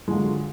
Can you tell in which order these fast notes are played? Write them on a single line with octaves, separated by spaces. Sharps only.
G#3 D3 F4 F#3